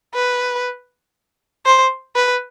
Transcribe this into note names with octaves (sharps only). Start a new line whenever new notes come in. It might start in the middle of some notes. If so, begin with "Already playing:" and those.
B4
C5
B4